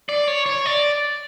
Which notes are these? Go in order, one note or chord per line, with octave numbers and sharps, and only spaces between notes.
D5
C#5
C#5
D5